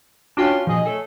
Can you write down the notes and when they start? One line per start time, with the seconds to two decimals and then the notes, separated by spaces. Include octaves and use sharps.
0.37 C#4 D4 F4 F#4 G5 A5
0.67 A#2 F3 G#4 D#5
0.85 A3 A4 C#5 G#5